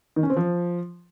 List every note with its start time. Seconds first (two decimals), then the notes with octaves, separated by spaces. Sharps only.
0.16 D#3
0.23 C#4
0.30 C4
0.36 F3